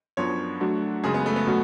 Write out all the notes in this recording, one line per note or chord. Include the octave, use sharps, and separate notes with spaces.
F#2 F3 B3 D4 C#5
F#3 A3 D4 F#4
F#2 C#3 G#3 G#4
B3
A3
B3
B2 F#3 A3 C#4 F#4